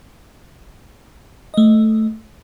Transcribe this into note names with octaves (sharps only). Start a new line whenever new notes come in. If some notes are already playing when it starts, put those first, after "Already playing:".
A3 D#5